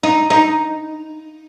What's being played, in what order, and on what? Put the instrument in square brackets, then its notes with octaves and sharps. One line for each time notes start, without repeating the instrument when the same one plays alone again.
[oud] D#4
D#4